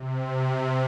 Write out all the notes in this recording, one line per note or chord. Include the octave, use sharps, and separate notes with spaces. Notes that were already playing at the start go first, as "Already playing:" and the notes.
Already playing: C3